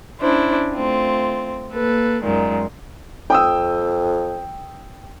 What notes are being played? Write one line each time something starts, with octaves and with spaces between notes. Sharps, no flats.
C#4 D4 E4 C5
A3 C4 F4
A#3 A4 B4
F#2 A#2 D#3 G#3
F2 G5 D#6 E6